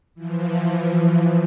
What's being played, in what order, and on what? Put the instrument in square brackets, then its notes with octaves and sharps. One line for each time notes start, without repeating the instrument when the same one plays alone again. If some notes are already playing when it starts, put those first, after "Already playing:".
[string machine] E3 F3